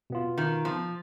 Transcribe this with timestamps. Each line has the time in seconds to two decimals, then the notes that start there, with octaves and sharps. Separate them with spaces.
0.10 B2 B3 F4
0.38 D#3
0.65 F3